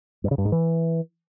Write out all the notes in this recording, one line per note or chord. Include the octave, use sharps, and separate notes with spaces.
G2
C#3
G2
G#2
E3